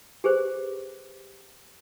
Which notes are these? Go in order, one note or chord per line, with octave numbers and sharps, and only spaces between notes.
G4 G#4 B4 C5